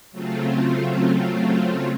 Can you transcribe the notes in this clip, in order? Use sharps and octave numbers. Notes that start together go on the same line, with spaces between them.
C#3 F#3 A3 C4 F4